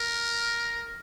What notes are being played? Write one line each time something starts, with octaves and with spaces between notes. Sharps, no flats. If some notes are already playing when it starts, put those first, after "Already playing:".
Already playing: A#4